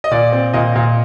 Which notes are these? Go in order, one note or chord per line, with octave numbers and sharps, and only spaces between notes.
D#5
A#2 D5
C4
A#2 D#5
A#2